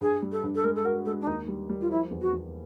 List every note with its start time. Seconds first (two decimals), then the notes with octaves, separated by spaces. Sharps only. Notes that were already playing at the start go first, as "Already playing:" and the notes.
0.01 G2 G#4
0.22 G3
0.32 A4
0.43 G2
0.55 A4
0.64 G#3 A#4
0.76 A4
0.85 F#4 A#4
1.06 G#3 A4
1.21 D4
1.27 D#2 D#4
1.48 G3
1.69 G3
1.81 F4
1.90 F3 E4
2.11 E2
2.21 F#4
2.33 E2